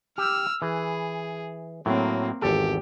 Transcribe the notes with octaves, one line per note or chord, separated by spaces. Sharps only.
G4 E6 F6
E3 G#4
A2 F#3 A#3 C4
G#1 E2 G4 A4